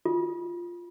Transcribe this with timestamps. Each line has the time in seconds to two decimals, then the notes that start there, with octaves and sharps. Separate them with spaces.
0.05 F4